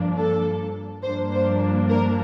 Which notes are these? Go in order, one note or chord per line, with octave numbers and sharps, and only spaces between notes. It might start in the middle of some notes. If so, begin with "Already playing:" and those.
Already playing: G2 F3 A#3 D4
A4
G2 F3 A#3 D4 C5
C5
A#4